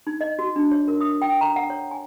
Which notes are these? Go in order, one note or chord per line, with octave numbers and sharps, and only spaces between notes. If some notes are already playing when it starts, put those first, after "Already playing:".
D#4
D#5
F#4
D4
C#5
A#4
D#6
G5
A#5
F#5
C#5
G#5